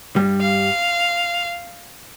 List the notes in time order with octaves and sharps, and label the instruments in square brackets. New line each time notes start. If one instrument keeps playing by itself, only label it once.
[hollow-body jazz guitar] G2 G3
[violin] F5